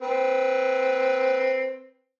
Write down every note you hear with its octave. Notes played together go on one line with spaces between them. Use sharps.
C4 B4